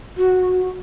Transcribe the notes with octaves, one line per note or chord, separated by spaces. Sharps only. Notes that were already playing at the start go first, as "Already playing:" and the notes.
F#4